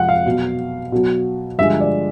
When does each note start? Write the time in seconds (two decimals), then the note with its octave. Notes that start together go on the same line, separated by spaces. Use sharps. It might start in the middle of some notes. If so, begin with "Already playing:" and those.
Already playing: F2 C3 F3 G#3 F#5
0.08 F5
0.26 B2 F#3
0.92 B2 F#3
1.58 G2 D3 F3 G#3 E5
1.80 D5